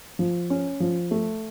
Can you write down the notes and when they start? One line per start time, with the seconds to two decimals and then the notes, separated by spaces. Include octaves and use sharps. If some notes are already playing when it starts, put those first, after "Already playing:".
0.19 F3
0.50 C#4
0.80 F3
1.11 A3